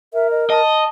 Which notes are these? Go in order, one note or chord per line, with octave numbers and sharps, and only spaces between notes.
A#4 E5
D#5
D#5 A5